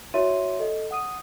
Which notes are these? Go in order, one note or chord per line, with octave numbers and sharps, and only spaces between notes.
E4 F#4 C#5 E5 C6 D#7
A4 D#5
F#5 D#6 D#7